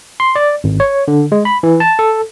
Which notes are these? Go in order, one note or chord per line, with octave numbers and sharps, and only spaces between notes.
C6
D5
G#1
C#5
D3
G#3
B5
E3
A5
A4